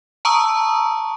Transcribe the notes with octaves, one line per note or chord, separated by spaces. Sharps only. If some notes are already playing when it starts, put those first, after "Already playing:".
A5 A#5 C#6 D#6 E6